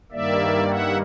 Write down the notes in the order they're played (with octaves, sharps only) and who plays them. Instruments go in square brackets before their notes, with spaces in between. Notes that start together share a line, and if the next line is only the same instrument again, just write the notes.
[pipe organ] G2 D#3 G3 A#3 D5 E5
E5 F#5